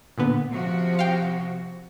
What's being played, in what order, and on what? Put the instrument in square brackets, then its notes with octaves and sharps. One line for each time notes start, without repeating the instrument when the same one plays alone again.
[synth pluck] A#2 D3 B3
[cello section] C3 F3 F#4
[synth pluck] F5 G5